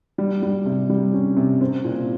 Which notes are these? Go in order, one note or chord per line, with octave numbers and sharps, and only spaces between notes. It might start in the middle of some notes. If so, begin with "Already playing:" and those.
G3
G3
C3
G3
C#4
C3
C4
A#2